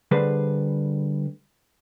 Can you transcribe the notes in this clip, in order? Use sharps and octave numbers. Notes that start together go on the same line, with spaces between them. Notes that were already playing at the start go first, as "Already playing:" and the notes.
D3 G3 G#4 B4 C5